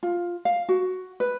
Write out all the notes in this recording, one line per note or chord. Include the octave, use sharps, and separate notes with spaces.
F4
F5
F#4
B4